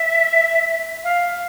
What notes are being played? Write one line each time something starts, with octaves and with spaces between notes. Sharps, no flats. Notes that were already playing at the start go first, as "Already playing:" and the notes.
Already playing: E5
F5